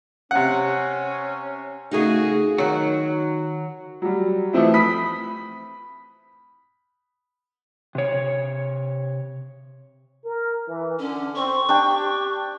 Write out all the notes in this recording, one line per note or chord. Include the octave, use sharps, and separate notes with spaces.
C3 C#4 F#5
C#3 A3 D#4 F#4 G#4
D#3 F#3 F#4
F#3 G3
E3 F3 A3 C4 E4
B5 D#6 B6
C3 C#5
A#4
E3
D3 C#4
C4 C#6
D4 G4 G5